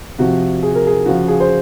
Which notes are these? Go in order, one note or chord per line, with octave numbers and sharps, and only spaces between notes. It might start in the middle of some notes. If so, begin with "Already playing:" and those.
C3 F3 F#4
G#4
A#4
G#4
C#3 F3 F#4
G#4
C5